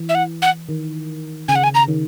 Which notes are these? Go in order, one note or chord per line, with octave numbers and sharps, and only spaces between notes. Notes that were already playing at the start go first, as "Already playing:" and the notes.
Already playing: E3
E5
F#5
F#5
D#3
C#3 G#5
F#5
G#5
A#5
D#3